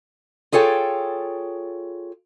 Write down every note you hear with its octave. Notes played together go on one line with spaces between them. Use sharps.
F4 G#4 A4 C#5 G5